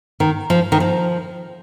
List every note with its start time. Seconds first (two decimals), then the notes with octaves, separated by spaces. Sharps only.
0.20 D#3
0.50 F3
0.72 D#3
0.80 F3